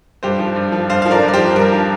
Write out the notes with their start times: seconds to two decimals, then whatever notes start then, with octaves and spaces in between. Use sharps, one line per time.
0.23 G2 G4 C5
0.39 F3
0.56 G2
0.72 F3
0.89 G2 C5 F5
1.02 F3 F5
1.11 A#4 D5
1.23 G2
1.28 D5
1.34 G4 C5
1.39 F3
1.56 G2 A#4
1.72 F3